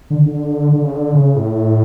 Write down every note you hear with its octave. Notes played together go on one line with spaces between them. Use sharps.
D3
D3
D3
C#3
D3
C#3
A2